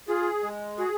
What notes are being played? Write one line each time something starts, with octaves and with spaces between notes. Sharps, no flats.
F4 G#4
G#3
F#4 G#4